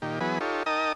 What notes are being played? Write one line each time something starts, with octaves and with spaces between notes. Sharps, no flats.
A#2 D#3 G4
E3 F#3 B3 G#4 B4
D#4 F4 G4 A4 C#5
D#4 A#4 D#5 G5 A5 D#6